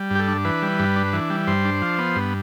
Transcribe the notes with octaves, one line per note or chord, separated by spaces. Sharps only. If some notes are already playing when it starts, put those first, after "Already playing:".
Already playing: G3
G2 G4
A4
D4
E3 B4
G3
G2
D4
E3
G3
G2 C5
D4
F3
B3
G2